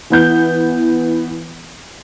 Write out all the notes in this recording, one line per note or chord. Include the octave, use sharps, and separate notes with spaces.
E3 B3 G6